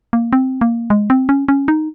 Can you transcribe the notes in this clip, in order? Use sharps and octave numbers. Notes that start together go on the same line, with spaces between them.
A#3
C4
A#3
G#3
C4
C#4
C#4
D#4